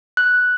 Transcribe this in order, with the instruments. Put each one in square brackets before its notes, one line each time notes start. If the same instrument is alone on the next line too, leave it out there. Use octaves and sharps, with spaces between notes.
[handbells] F#6